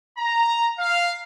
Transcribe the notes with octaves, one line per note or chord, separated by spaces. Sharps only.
A#5
F5